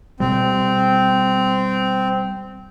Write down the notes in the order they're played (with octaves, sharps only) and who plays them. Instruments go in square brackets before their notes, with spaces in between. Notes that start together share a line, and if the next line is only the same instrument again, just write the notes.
[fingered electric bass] B2 G3 [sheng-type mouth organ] C4